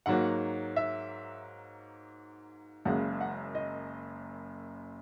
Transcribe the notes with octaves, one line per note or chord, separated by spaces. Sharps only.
G#2 F#3 A#3 F#5
E5
F#1 F#2 C#3 G#3 F#5
F#5
D#5